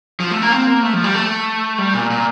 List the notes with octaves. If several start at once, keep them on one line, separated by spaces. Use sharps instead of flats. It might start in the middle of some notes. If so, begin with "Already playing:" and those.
F3
A3
A#3
C4
A#3
A3
F3
G3
A3
G3
A#2
A#2